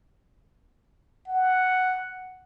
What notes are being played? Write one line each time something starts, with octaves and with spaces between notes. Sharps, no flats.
F#5